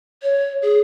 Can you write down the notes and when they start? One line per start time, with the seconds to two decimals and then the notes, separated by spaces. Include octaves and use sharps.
0.22 C#5
0.62 G#4